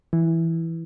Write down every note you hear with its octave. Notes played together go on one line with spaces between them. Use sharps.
E3